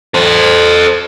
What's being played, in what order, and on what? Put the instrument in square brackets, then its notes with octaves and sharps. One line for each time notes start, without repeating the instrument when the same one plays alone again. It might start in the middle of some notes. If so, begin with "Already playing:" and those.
[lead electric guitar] A4 C5